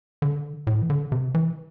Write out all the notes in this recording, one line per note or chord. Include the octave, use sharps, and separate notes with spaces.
D3
A2
E3
D3
C3
E3